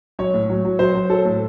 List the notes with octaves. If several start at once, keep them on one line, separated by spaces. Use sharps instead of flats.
F#3 C#5
A2
F#3
F#3
F#3 C5
F#3
F#3 A4
A2